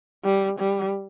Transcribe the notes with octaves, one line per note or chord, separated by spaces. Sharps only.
G3
G3